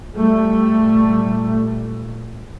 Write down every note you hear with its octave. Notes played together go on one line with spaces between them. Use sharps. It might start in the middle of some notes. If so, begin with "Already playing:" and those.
Already playing: A#2
G3 A3